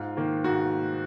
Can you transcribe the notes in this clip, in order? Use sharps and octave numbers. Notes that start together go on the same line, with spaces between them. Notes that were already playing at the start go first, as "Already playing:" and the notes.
Already playing: G#2 F4
D#3 A#3
G#2 F#4